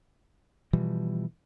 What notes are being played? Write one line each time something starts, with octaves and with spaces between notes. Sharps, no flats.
B2 E3 F3 G3